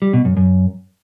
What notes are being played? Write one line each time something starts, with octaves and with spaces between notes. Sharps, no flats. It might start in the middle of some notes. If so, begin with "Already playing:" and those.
G3
B2
F#2
F#2